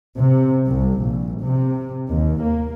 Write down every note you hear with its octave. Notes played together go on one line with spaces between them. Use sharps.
C3
C2
A#1
C3
D#2
A#3